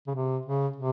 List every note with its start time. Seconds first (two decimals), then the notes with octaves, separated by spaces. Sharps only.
0.07 C#3
0.15 C3
0.45 C#3
0.76 C3